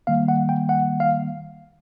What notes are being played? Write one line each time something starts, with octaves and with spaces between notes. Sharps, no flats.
D#3 G3 A#3 F5
F#5
G5
F#5
F5